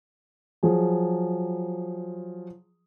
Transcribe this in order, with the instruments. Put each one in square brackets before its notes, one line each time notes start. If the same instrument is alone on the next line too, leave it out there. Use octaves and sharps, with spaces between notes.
[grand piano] F3 F#3 G#4